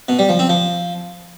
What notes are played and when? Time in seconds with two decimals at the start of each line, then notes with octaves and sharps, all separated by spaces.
0.09 B2
0.19 G3
0.29 F3
0.39 C4
0.49 F3